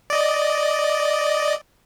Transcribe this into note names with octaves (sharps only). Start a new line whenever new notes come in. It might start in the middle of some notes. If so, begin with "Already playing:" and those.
D5 D#5